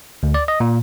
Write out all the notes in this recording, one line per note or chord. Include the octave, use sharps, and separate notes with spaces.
D2
D5
D#5
A#2